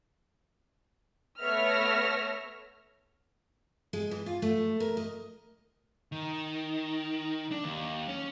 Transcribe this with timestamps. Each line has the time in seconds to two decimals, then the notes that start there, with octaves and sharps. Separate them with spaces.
1.40 A3 B3 C#5 E5 F6 A#6
3.93 G#3
4.11 E3
4.26 F4
4.42 A3
4.80 A#4
4.97 D#5
6.12 D#3
7.51 D4
7.64 D#2
8.09 C#4